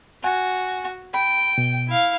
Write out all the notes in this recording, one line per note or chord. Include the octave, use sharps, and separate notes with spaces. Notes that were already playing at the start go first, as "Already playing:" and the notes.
F#4 F#5 G#5
G5 B5
B2
E4 F5